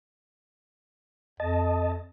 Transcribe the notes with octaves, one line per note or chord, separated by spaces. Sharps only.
F2 D#5 A5